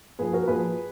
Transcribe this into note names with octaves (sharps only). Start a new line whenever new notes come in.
A#2 F3 G#4 B4
F#4 A#4
A#2 F3 G#4 B4